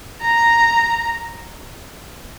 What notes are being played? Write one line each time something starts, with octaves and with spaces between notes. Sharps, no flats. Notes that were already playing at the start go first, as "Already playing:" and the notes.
A#5